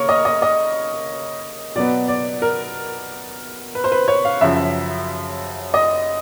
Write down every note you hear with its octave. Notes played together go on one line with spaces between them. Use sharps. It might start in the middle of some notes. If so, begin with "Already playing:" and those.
Already playing: C#3 A#3 A#4 C#5
D#5
D#5
D#5
B2 F#3 B3 D5
D5
A#4
B4
C5
B4
C#5
F5
F#2 C#3 F3 E5
D#5